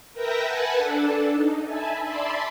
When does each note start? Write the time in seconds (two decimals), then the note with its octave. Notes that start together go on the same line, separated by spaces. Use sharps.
0.13 A#4 B4 E5 G5 G6 A#6
0.44 B4 F#5 G#5 A5
0.77 D4 A4
1.32 D#4
1.65 E5 G#5 A5 B5
2.04 D5 E5 A5 B5 C6